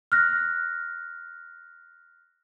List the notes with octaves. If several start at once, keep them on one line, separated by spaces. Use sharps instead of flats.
F6 F#6 A#6